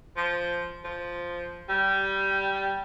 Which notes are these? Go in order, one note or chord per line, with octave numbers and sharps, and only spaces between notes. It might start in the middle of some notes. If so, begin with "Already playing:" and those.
F3
F3
G3